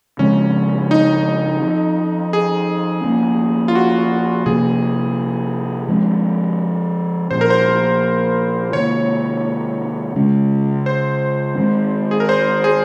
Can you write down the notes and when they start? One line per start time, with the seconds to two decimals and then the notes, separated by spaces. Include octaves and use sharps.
0.19 C#3 F3 G#3 C4 C#4
0.91 D#4
1.61 F3 C4
2.33 G#4
3.04 F3 A#3 C#4
3.68 F4
3.75 F#4
4.46 C3 F3 A#3 G#4
5.88 F3 G#3 C4
7.31 A#2 F3 A#3 C#4 C5
7.41 A#4
7.50 C5
8.73 C3 D#3 A#3 C#5
10.15 C#3 G#3 C#4
10.86 C5
11.58 D#3 G#3 C4
12.11 G#4
12.20 A#4
12.29 C5
12.64 G#4